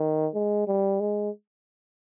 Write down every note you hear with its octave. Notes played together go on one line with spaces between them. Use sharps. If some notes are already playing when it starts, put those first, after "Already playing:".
Already playing: D#3
G#3
G3
G#3